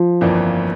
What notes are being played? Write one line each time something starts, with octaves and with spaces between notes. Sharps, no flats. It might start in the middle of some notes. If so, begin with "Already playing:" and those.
Already playing: F3
G1 F2 E3 A#3 D4